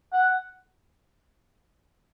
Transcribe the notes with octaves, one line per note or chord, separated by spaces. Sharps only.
F#5